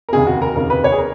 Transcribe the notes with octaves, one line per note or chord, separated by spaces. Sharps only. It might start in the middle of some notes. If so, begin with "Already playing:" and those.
A#4
F1 D#2 C#3 G#4
F#4
A#4
F1 D#2 C#3 A#4
B4
C#5
G#4
A#4